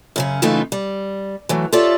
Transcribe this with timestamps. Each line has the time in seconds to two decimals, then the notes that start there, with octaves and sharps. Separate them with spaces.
0.16 F#2 C#3 C#4
0.42 F#2 C#3 E3 A3 D#4 F4
0.72 G3
1.49 E3 F#3 A3
1.73 F4 G4 A4 C#5 D5 E5